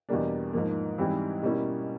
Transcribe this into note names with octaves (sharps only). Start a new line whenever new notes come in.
E2 B2 G3 A#3 D4
G#2 F3 A#3
G#2 E3 G3 C4 E4
B2 G3 A#3 C#4 E4